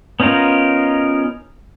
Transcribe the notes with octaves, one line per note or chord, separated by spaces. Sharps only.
B3 C#4 D#4 F4 A#4